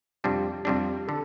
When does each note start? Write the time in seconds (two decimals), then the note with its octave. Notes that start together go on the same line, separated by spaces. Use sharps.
0.24 F2 C3 G3 D4 G4
0.65 F2 C3 G3 D4
1.07 D3 A4